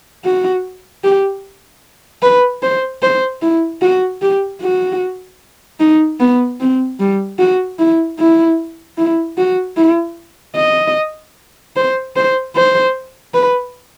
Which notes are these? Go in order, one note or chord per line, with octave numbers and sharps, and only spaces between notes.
F#4
G4
B4
C5
C5
E4
F#4
G4
F#4
D#4
B3
C4
G3
F#4
E4
E4
E4
F#4
E4
D#5
C5
C5
C5
B4